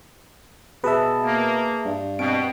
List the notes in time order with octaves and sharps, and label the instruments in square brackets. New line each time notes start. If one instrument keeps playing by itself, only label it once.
[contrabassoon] B2 [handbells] G#4 A5 [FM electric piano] B4 E5
[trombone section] A#3
[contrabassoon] G2
[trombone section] B2 [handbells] C4 D7